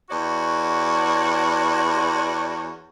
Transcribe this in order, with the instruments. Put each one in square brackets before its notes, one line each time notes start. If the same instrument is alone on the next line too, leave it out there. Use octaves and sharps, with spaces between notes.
[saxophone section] E2 F#4 C#5 D5